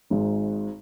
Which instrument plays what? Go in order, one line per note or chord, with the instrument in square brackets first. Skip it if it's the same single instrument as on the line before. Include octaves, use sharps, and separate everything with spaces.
[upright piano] G#1 G#2 G#3 D#4